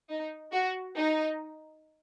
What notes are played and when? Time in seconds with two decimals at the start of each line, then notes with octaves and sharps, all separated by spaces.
0.10 D#4
0.52 F#4
0.96 D#4